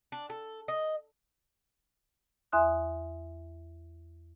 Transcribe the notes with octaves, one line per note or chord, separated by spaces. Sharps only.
D4
A4
D#5
E2 E5 G#5 C6 D#6 F#6